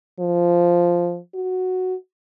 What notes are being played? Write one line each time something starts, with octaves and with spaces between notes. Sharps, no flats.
F3
F#4